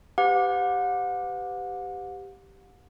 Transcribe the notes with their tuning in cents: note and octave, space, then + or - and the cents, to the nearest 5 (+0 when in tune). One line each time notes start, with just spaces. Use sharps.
G4 +0 B4 +40 F#5 -40